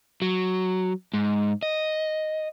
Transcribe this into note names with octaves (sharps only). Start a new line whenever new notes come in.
F#3
G#2
D#5